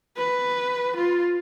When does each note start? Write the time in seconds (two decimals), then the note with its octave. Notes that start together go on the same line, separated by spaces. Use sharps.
0.17 B4
0.96 F4